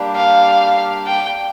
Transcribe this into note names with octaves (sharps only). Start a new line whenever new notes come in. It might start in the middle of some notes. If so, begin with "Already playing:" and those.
Already playing: G3 A#3 D4 G4
F5
G5